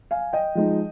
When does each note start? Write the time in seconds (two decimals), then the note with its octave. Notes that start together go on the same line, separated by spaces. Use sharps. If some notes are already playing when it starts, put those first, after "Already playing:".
0.11 F5 G#5
0.33 D#5 G5
0.55 F3 G#3 D#4